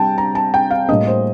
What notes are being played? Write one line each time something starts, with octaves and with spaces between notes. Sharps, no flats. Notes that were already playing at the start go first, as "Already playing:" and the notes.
Already playing: C3 G3 C4 G5 A5
A#5
A5
G5
F5
A2 G3 A#3 D#5
C5